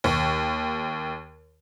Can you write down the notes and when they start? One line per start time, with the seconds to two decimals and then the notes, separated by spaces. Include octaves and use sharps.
0.04 D#2 C#6